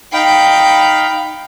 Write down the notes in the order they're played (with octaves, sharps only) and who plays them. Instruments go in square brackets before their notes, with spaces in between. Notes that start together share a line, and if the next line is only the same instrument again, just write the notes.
[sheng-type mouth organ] D#4 F5 B5 [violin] G5